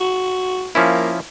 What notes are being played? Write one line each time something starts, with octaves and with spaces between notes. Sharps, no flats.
F#4
F3 A#3 C#4 E4